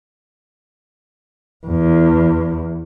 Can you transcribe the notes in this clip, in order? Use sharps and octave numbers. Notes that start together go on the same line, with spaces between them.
E2